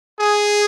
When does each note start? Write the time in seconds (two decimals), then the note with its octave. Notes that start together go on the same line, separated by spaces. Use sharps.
0.18 G#4